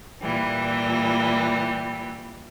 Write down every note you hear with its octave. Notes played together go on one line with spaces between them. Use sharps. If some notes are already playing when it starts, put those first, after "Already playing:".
A#2 E3 G3